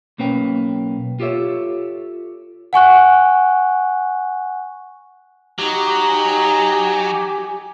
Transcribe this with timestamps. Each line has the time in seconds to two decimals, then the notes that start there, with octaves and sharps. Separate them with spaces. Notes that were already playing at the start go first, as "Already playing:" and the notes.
0.18 B1 B2 A#3 C#4 B4 G5
1.20 F4 G4 A4 C#5 E5
2.73 F#5 G#5 C#6 F#6
5.59 F#3 D#4 G4
6.04 G#5